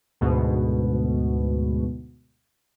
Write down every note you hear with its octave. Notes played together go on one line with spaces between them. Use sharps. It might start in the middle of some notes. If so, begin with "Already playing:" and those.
D2 G#2 B2